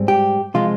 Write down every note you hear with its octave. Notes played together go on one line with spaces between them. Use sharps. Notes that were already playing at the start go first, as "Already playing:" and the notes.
Already playing: G#2 G3 C4
G4
C3 F3 G#3 F4